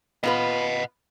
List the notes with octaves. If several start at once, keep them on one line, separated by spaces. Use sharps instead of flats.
B3 F4 B4 D#5 F#5